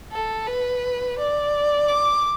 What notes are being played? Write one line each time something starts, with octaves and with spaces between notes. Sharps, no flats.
A4
B4
D5
D6